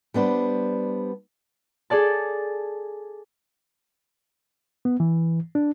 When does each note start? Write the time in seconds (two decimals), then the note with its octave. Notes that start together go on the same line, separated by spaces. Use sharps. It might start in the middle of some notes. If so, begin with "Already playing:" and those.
0.14 G3 B3 D4 C5
1.90 G#4 A4 D5 A5
4.85 B3
5.00 E3
5.55 D4